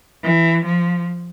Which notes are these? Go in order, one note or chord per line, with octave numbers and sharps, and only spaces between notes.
E3
F3